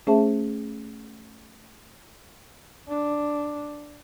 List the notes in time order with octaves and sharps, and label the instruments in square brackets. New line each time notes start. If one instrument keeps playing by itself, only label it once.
[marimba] A3 C#4 G#4 C5 E5 A5
[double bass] D4